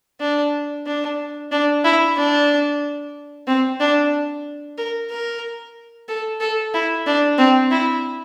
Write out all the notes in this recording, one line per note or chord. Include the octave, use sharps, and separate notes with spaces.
D4
D4
D4
E4
D4
C4
D4
A#4
A#4
A4
A4
E4
D4
C4
E4